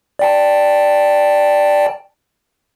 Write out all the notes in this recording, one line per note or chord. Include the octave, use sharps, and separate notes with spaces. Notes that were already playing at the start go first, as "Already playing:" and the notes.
D5 G5 A5